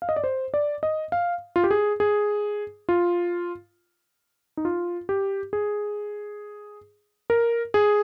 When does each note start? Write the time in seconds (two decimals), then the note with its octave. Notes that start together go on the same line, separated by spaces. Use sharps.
0.02 F5
0.09 D#5
0.16 D5
0.24 C5
0.54 D5
0.83 D#5
1.12 F5
1.56 F4
1.64 G4
1.71 G#4
2.00 G#4
2.89 F4
4.57 D#4
4.65 F4
5.09 G4
5.53 G#4
7.30 A#4
7.74 G#4